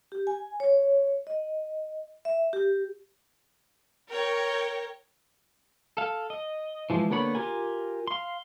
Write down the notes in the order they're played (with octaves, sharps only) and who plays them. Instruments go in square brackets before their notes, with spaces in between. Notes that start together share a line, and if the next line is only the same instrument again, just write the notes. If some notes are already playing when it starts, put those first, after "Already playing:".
[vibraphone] G4
G#5
C#5
D#5
E5
G4
[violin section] A#4 C#5 G5 A#5
[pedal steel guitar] A4 F5
D#5
E3 F3 G#3
D3 A#3 B3 C#5 B5
F4 G4 A#4 G#5
F5 C6